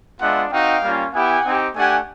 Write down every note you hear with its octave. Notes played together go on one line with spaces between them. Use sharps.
G#3 B3 D4 F4 E5 F#5
C4 D#4 F#4 F5 G5
G3 A#3 C#4 F4
B3 E4 G4 F#5 G#5
C4 D#4 G4
A3 D4 G4 F#5 G#5